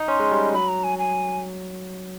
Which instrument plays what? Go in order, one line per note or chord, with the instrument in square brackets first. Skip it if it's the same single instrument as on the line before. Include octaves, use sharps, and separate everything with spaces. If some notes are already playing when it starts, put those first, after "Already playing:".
Already playing: [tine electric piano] D#4
[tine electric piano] C#4 [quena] C6
[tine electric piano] G#3
G3
[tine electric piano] F#3 [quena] B5
[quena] A#5
G#5
G#5